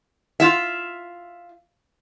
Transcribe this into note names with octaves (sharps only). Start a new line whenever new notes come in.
F4 E5